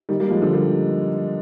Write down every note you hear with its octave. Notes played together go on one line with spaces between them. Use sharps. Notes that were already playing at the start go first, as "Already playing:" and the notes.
D#3 G3
G3 A#3
F3 G#3
D3 F3
G3 A#3